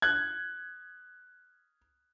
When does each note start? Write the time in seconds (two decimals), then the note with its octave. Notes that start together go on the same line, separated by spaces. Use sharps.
0.02 F#6 G#6